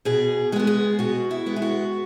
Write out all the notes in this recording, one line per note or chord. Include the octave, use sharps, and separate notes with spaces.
B2 G#4
G#3 B3 F#4 G#4
G#4
B2 F#4
E4
G#3 B3
G#4
F#4